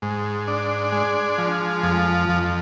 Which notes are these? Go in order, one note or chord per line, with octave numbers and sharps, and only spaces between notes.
G#2
D4
G#3
F3
F2
F2